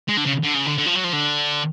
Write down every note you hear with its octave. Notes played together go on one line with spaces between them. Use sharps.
G#3
D3
C#3
D3
C#3
D3
D3
F3
F#3
F3
D3